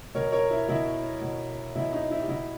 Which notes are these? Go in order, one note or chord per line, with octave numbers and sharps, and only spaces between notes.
B2 A#4 C#5
A#4 C#5
E4
B2 E4
B2
B2 E4
D#4
E4
G4
B2 E4